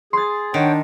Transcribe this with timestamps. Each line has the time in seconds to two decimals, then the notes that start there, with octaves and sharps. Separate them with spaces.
0.13 G#4 C6 A6
0.54 D#3 D4 C#5 F#5 G5